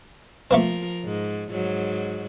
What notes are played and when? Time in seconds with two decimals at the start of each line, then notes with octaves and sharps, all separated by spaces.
0.51 F3 A3 A#3 C4 A#4
1.05 G#2
1.50 G#2 F#3